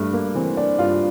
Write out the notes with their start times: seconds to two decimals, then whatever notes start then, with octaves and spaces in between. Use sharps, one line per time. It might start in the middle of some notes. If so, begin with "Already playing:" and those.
Already playing: G2 A3
0.13 A#3
0.35 E3 C4
0.57 D4
0.79 G2 F4